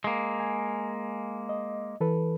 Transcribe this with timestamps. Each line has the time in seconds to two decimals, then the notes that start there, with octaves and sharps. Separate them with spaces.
0.04 G#3 A#3
0.40 G#5
1.49 D#5
2.00 E3 A4 B4